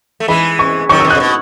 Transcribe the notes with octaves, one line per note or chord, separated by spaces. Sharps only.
A3
E3 G#3 B5
C#6
D#3 F#3 C#6
E6
B2 D#3
C#3 F#6
B2